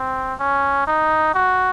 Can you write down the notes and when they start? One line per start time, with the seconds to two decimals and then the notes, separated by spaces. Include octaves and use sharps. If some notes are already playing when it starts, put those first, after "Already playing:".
Already playing: C4
0.40 C#4
0.87 D#4
1.34 F#4